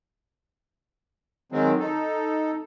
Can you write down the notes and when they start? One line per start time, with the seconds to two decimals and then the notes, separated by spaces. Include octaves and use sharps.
1.52 D#3 F#3 G#3 C4
1.79 D#4 A4